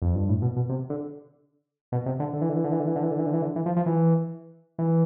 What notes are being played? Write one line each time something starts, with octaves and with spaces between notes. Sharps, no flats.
F2
G2
A2
B2
B2
C3
D3
B2
C3
D3
D3
E3
D3
E3
D3
E3
D3
E3
D3
E3
D3
E3
D3
E3
D3
E3
F3
F3
E3
E3